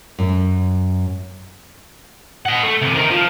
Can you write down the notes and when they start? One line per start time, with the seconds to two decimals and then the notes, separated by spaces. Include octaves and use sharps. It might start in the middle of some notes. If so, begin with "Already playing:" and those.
0.19 F#2
2.46 D#5 F#5
2.63 A3
2.82 C3 E3
2.95 D#3 A#4
3.11 F3